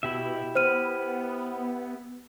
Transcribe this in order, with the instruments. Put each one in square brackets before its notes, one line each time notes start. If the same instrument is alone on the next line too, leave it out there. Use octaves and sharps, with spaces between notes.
[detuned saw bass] B2 [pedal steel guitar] E4 G4 E5
[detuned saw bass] B3 [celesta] C5 F6 D#7